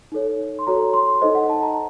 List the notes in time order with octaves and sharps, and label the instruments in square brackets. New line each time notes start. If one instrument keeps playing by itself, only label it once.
[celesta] D#4 A4 C#5
C6
F#4 A4 C#5 A#5
C6
D#4 A4 C5 D#5
F#5
A5
A#5